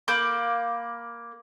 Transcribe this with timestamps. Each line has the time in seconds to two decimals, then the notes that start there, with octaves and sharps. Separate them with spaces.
0.08 A#3 B5 D6 G6